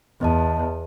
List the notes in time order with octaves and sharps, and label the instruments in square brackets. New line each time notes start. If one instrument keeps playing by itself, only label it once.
[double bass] E2 [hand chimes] B3 D#5 A5